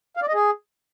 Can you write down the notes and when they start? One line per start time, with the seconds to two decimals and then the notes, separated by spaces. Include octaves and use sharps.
0.17 F5
0.22 D5
0.28 D#5
0.34 G#4